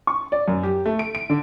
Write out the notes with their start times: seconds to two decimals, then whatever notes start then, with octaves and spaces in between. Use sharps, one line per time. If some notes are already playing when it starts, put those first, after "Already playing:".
0.07 C#6
0.32 D5
0.48 F#2
0.63 G4
0.86 A3
0.99 D7
1.15 D7
1.30 D3